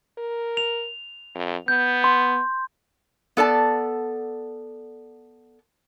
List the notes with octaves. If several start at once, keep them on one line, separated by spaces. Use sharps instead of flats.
A#4
F7
F2
B3 G6
C6
B3 A4 D5 A5